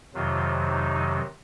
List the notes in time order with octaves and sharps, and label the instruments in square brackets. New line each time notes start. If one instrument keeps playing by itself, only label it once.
[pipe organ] F2 C3 D#3 F#3 F4
D#4